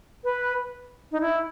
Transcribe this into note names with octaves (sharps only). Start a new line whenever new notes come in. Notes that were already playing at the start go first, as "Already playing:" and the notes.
B4
D#4
E4